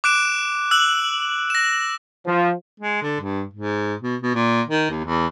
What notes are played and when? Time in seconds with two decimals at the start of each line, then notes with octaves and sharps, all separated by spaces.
0.04 D6 F#6 D7 E7
0.71 E6 F#6 F#7
1.50 A#6 E7
2.24 F3
2.80 G#3
3.02 D3
3.21 G2
3.53 G#2
4.02 B2
4.22 B2
4.35 A#2
4.68 D#3
4.90 D#2
5.05 E2